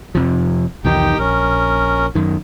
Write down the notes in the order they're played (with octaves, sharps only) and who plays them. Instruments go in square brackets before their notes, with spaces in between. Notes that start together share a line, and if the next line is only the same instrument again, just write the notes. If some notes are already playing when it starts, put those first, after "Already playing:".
[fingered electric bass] F2 C3 F3
[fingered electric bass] B1 E2 D#3 [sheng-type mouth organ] D#4 G4 G5
[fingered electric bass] A#1 [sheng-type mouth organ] C#4 A#4
[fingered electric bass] F#2 D#3